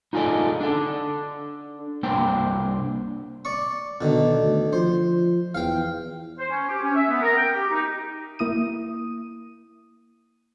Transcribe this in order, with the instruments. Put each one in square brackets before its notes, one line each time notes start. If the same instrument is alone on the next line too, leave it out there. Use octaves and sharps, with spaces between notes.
[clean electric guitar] D#4 F4 G#4 A4 D5 D#5
D4 A4
C2 A#3 D4 C5 G5
[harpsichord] D5 C#6
[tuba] B2 [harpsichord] D3 D#3
[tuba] D2
[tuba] F3 [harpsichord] C5
[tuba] E2 [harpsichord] F5 G5
[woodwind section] C5
C#4
G4
C#4
E5
B3
A#4
G5
G4
D#4
[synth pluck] A#3 E4 D#6 D#7